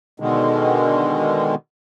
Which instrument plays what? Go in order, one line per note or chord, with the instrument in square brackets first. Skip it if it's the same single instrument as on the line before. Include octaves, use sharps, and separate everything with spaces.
[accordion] B2 D3 D#3 G#3